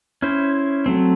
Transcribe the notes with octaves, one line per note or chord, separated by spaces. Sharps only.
C#4 E4 C5
F#3 A3 C4